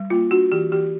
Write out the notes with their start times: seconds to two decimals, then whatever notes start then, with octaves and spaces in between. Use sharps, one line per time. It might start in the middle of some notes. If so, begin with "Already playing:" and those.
Already playing: G3
0.10 A#3 F4
0.31 D4 F#4
0.52 E3 G4
0.72 E3 G4